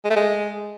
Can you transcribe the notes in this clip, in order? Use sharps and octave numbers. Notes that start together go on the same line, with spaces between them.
G#3
A3
G#3